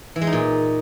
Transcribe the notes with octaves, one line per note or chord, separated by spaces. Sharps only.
E3
G#3
D#4
A#2